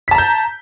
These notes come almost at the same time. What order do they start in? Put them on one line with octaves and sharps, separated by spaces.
B6 A5 A#5 G6